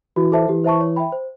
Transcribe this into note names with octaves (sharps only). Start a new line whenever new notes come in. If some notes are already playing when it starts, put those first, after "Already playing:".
E3 F#4
A4 C5 E5 A5
E3 G4
C5 E5 A5 C#6
C#5
E5 G5 B5
C5